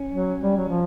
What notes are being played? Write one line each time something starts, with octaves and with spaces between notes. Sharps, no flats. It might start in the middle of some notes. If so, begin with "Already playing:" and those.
Already playing: C#4
F#3
G3
F#3
F3